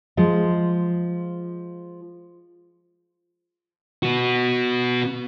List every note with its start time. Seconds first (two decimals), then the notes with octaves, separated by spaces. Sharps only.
0.17 F3 G#3
4.03 B3 F#4